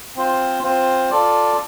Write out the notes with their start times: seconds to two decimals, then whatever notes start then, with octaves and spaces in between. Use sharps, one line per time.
0.16 C4 F4 C5
0.63 C4 F4 C5
1.11 F4 A4 D5